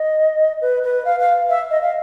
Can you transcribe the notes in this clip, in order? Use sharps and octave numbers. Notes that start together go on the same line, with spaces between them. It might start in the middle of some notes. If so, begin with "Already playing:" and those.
Already playing: D#5
B4
B4
F5
F5
E5
D#5
F5